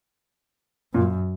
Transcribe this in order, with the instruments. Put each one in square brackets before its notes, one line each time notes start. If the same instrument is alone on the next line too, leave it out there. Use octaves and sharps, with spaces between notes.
[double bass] F#2 [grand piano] A#2